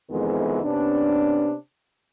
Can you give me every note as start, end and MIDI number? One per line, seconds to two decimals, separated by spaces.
0.10 0.63 41
0.10 0.63 48
0.10 0.63 51
0.10 0.63 52
0.10 0.63 56
0.10 0.63 59
0.64 1.54 48
0.64 1.54 59
0.64 1.54 61
0.64 1.54 62